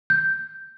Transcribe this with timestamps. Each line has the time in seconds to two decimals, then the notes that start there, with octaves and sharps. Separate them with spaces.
0.10 G6